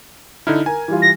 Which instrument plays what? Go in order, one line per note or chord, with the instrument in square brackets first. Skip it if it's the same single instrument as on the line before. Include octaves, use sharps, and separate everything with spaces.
[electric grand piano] D3 D#4 E4 [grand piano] F6
[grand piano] A#4 [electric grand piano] G#5
[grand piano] E3 G3 F4
[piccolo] A#6